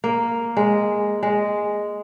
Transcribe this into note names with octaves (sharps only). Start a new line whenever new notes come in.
A#3
G#3
G#3